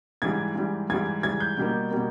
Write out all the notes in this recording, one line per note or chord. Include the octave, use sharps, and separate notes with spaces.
G#2 E3 G3 G#6
G#2 E3 G3
G#2 E3 G3 G#6
G#2 E3 G3 G#6
G6
B2 G3 A#3
B2 G3 A#3